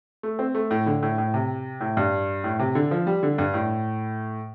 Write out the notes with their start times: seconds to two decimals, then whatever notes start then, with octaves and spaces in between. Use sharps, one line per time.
0.23 A3
0.39 C4
0.55 A3
0.71 A2
0.86 D3
1.03 A2
1.18 A2
1.34 C3
1.81 A2
1.97 G2
2.44 A2
2.59 C3
2.75 D3
2.91 F3
3.07 G3
3.23 D3
3.38 G2
3.54 A2